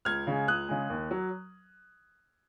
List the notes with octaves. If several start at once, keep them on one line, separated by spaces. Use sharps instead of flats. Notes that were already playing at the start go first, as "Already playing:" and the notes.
C#2 F6 G#6
C#3 G#3
C#2 D#6 F#6
C#3 G#3
D#2
F#3